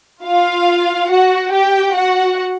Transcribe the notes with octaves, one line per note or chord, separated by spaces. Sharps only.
F4 F5
F#4 F#5
G4 G5
F#4 F#5